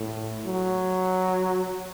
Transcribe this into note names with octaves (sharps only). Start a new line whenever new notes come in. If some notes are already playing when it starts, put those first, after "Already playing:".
Already playing: A2
F#3